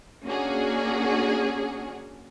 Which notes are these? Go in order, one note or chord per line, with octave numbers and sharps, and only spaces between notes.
A#3 C#4 D4 F#4 G#4